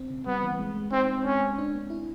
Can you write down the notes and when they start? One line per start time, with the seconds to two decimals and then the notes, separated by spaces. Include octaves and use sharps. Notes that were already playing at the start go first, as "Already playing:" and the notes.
Already playing: C4
0.10 C#3
0.26 G3 B3
0.43 E3
0.59 G#3
0.75 G#3
0.92 C4 D#4
1.08 C4
1.25 G#3 C#4
1.41 G#3
1.58 D4
1.74 B3
1.90 E4